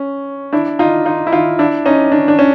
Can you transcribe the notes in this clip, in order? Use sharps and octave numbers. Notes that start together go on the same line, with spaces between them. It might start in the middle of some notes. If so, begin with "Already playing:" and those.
Already playing: C#4
D4 E4
D#4 F4
D#4 F4
E4
D#4 F4
D4 E4
C#4 D#4
D4
D4
C#4